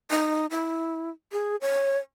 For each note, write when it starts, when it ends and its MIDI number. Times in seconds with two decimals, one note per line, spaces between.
0.11 0.46 63
0.51 1.09 64
1.32 1.56 68
1.61 1.97 73